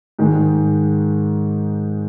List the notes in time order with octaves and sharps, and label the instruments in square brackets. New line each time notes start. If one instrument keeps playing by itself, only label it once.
[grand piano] G#2 D#3 G#3